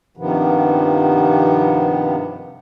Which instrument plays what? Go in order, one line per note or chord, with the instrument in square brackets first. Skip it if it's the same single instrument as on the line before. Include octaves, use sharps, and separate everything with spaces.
[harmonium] G2 C3 D#3 F3 B3